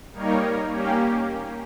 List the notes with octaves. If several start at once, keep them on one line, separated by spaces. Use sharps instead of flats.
G3 A#3 D#4 A#4 C#5
A#3 C#4 G4